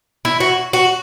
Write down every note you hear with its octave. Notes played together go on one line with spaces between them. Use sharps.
E4
F#4
F#4